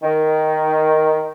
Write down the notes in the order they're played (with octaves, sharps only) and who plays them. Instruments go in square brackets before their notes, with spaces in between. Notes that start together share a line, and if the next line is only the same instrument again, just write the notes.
[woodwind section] D#3